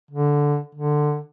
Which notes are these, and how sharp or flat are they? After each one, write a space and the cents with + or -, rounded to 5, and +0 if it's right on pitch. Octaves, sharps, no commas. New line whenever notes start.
D3 -10
D3 +15